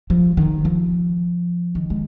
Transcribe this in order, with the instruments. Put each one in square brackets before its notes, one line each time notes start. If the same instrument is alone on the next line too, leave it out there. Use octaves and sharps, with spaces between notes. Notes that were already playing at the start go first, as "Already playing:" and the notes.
[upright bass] F3
D#3
F3
D#3
G#3